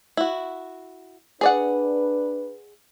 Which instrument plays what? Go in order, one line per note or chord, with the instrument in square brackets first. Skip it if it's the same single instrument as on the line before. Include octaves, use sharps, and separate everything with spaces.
[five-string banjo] E4 F#4
[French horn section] D4 B4 [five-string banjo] G#4 D5 F#5